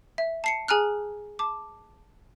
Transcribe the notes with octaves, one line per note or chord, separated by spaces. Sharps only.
E5
A5 C7 C#7
G#4 G#5 A#5 F6 F#6
A5 D6